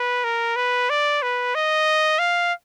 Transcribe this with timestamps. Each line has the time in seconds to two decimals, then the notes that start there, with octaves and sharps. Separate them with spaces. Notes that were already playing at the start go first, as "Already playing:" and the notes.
Already playing: B4
0.24 A#4
0.56 B4
0.90 D5
1.22 B4
1.55 D#5
2.19 F5